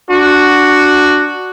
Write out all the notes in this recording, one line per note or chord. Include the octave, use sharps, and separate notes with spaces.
D4 F#4